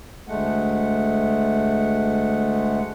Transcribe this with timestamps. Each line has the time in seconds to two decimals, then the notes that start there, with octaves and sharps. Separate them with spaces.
0.28 D2 G#3 A3 F#5